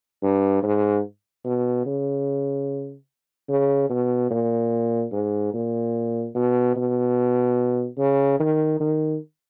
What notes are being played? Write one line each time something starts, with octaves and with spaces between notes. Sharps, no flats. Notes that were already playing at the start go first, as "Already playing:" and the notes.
G2
G#2
B2
C#3
C#3
B2
A#2
G#2
A#2
B2
B2
C#3
D#3
D#3